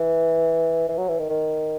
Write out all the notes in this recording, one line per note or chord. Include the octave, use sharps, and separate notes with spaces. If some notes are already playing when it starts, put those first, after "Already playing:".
Already playing: E3
E3
F#3
E3
D#3
D#3